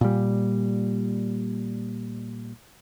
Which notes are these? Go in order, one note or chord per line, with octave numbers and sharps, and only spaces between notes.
A#2 G3